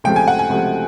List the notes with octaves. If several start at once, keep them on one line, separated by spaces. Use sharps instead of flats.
C#2 C3 F3 A3 G5
G#5
F#5
G#5
C#2 C3 F3 A3